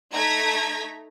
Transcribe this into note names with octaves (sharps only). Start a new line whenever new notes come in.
A3 D#4 A#5 G#6 A#6 B6